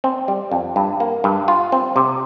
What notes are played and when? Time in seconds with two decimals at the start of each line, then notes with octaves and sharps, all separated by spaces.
0.04 C4
0.28 G3
0.51 F2
0.76 G2
1.00 A#3
1.24 G2
1.48 F4
1.72 C4
1.96 C3